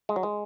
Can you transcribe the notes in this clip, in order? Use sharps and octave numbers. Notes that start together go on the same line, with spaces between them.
G#3
F#3
G#3